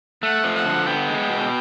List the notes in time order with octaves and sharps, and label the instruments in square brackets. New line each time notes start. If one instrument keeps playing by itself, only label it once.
[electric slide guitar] A3 [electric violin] F#5
[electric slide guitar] F3
[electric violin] F#5
[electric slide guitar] D3
[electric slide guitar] B3 [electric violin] G5
[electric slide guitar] G#3
B2